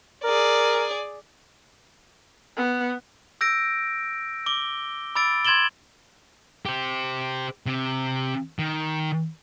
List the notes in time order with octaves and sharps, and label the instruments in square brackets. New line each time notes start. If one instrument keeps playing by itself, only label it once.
[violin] G#4 D5 [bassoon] A#4
[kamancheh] B3
[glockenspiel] E6 G6 A#6 D7
D6 G7
B5 D6 E6 A6 D7
C6 G#6 A6 E7 F#7 G7
[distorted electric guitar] G4 C5
C3
D#3